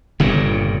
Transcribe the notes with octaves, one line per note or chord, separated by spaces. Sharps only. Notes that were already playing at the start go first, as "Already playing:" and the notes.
G1 G2 A#2 C#3